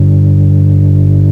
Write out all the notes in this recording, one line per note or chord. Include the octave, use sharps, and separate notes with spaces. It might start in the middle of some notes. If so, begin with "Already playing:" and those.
Already playing: G2 D3